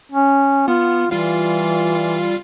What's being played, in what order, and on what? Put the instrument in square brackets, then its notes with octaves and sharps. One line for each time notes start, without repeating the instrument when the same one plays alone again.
[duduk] C#4
[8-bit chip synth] B3 [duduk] F4
[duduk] E3 [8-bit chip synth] G3 F4 F5